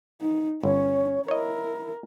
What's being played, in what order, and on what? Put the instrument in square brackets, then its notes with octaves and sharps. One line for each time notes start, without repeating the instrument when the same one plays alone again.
[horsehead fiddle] D#4
[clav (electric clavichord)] G1 [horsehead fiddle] C#4 [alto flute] C#5
[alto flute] E4 [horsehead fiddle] A#4 [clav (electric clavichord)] C#5 D#5